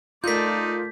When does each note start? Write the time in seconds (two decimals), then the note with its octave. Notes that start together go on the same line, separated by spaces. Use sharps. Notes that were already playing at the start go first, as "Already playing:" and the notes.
0.24 A3 D#4 F4 A#4 D5 G6 B6